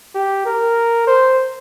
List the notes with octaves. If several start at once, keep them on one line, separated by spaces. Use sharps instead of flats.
G4
A#4
C5